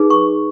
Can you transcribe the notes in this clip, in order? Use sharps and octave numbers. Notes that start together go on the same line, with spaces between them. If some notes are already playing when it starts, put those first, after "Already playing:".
Already playing: D#4 G#4 B4
C#6